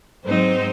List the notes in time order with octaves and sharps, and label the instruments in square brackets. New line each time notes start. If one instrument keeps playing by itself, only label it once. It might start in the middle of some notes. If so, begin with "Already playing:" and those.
[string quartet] G#2 F#3 C4 D#4 C5